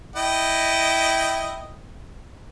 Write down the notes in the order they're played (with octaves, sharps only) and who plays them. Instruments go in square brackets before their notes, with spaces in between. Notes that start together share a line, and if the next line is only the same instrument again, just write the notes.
[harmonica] E4 D#5 G5